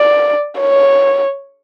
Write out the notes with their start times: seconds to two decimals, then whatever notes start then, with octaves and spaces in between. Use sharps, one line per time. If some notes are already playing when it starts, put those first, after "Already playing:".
Already playing: D5
0.60 C#5